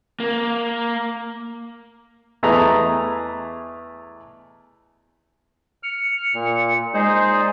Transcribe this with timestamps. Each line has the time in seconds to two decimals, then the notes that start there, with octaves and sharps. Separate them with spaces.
0.20 A#3
2.43 E2 A3 G#4 B4 D#5 A#5
5.83 F6 C#7
6.34 A#2
6.94 G#3 D#4 G#4 C5
7.32 D5